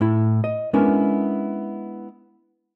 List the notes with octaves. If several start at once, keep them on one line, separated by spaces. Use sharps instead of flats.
A2 E4
D#5
G#3 B3 C#4 D4 E4 A#4